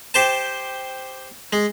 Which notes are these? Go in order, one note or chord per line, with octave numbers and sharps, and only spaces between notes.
G4 C5 A5
G#3